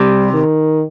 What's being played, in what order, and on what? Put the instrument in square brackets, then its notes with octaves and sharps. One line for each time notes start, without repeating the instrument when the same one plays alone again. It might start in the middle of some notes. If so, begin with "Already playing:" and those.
Already playing: [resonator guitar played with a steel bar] C3 [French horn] G3
[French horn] D#3